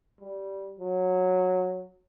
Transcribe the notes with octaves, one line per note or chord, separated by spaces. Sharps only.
G3
F#3